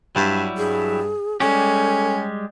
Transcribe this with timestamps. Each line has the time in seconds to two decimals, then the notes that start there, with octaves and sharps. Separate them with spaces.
0.16 G2 F#3 G3 E4
0.58 G2 G#4
1.40 G3 G#3 C#4 G4 A4